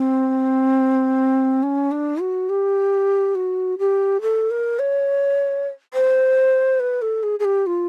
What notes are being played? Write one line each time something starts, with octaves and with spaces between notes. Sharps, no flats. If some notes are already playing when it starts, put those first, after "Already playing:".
Already playing: C4
C#4
D4
F#4
G4
F#4
G4
A4
A#4
C#5
C5
B4
A4
G#4
G#4
G4
F4